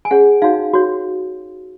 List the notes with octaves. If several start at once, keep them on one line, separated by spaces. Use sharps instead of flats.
G#5
C#4 G#4 C#5 F#5
D#4 F#4 C#5 F5
F#4 C#5